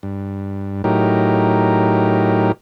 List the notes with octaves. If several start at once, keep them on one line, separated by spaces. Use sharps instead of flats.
G2
A2 F#3 D#4 G4 A#4